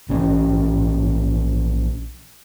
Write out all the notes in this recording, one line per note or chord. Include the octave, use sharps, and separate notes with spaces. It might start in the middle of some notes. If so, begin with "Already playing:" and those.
A#1 E3 C#4